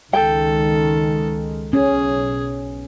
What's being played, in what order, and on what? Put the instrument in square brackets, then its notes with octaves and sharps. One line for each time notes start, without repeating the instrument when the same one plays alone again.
[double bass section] C#2 D#3 G#3 [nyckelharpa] A4 [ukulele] G5
[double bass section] B1 [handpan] C#4 [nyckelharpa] G#4